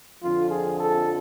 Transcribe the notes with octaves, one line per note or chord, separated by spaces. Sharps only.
F2 D3 F3 F4
G#4
A4